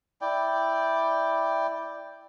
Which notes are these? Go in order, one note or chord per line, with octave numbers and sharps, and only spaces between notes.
E4 D5 G5